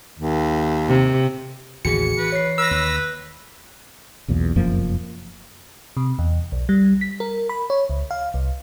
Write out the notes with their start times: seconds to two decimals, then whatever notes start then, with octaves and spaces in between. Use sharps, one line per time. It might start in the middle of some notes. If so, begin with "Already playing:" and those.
0.19 D#2
0.88 C3
1.85 A1 D#2 C#3 F#4 G#4 C#7
2.18 E3 B4
2.32 C#5 C7
2.58 B4 E6 A#6
2.71 D#2
4.28 B1 E2 A#2
4.56 F1 F#2 F3 A#3
5.97 C3
6.19 E2
6.52 B1
6.69 G3
7.01 B6
7.20 A#4
7.49 B5
7.70 C#5
7.90 C#2
8.11 F5
8.34 C2